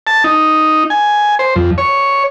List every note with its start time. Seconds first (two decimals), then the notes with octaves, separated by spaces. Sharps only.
0.07 A5
0.24 D#4
0.90 G#5
1.39 C5
1.56 F2
1.78 C#5